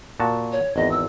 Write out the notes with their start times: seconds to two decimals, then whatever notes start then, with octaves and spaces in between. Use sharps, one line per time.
0.20 A#2 F#4 A5
0.53 C#5
0.76 G#1 E2 D#5
0.91 E6